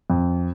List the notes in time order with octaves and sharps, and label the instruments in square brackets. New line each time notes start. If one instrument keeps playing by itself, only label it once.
[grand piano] F2